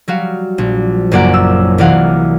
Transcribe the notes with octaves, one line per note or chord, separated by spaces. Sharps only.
F#3 G3 F#4 F5
A#1
F#1 F#2 A#3 D5 F#5 D7
E6
C2 E3 F#3 D5 F5 F#5